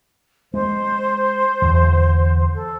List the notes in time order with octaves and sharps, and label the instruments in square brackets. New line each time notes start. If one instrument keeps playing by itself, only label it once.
[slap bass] G#3 [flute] C5
[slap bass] E2 D3
[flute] A4